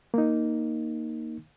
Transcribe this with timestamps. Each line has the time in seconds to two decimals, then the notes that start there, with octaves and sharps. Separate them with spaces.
0.14 A#3 D#4